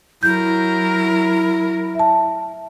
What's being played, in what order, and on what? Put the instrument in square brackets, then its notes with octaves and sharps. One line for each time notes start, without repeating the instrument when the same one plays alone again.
[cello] F#3 A#4 [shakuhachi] E4 [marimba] G6
[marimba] E5 A5